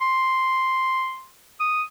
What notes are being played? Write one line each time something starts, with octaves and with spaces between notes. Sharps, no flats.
C6
D#6